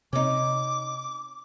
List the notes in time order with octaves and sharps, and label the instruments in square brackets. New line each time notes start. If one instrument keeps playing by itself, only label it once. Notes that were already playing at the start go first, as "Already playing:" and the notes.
[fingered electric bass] C3 C4 [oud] C#4 D#4 [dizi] D6